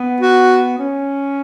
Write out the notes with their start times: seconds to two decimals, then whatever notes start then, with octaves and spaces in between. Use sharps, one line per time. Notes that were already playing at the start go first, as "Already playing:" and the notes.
Already playing: B3
0.20 F#4
0.78 C#4